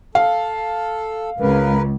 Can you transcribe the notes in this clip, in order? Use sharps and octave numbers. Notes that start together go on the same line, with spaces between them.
A4 F5
C#2 A#4 B4